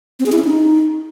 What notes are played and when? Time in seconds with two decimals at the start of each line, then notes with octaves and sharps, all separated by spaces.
0.19 C4
0.26 G#4
0.32 E4
0.38 C#4
0.45 D#4